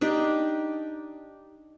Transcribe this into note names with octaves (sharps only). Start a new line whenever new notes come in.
D4 D#4 G4